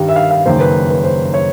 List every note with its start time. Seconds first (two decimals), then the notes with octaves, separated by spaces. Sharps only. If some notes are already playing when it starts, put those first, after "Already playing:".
Already playing: G2 D#3 G3
0.09 E5
0.16 F5
0.31 F5
0.46 F#1 F#2 D#3 C5
0.60 B4
0.90 B4
1.04 C5
1.34 C#5